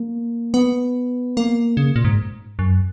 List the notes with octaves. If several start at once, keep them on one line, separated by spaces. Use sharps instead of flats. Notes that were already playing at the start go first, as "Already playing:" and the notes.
Already playing: A#3
B3
A#3
C#3
A#2
G#2
F#2